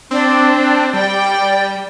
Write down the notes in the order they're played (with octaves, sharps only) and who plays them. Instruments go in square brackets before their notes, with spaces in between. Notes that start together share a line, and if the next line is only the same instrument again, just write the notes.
[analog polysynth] C4 [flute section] D4
[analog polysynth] G3 [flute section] D5 [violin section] G5